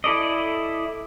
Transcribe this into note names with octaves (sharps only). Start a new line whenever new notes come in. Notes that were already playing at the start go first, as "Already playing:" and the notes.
E4 A4 D5 D#5